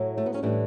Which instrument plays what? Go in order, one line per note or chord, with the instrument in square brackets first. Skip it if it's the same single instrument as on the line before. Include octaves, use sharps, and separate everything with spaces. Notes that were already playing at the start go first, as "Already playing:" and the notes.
Already playing: [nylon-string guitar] A2 F#3
A3
B3
C#4
A2 E3 G3 D4